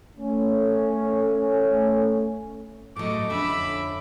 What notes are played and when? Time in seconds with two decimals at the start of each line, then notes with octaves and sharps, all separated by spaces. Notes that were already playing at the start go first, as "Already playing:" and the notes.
0.18 A3 C#4
2.96 A2 F#3 A3 D#5 D6
3.30 F2 D3 C#4 E5 B5